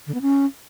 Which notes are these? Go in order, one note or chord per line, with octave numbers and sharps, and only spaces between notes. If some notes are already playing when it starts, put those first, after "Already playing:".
D3
B3
C#4